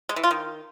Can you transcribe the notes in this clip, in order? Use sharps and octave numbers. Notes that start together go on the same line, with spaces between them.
G#3
E3
F4
D#3